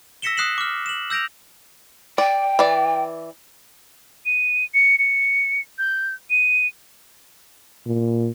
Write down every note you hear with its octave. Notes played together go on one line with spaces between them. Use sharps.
E6 A#6 B6 C#7 E7 G7
D#6 F#6 C7 E7 F#7
D6 F6
E7 F#7
E6 G6 A#6 D7 F7
D5 G5
E3 D5
D#7
C#7
C#7
G6
D#7
A#2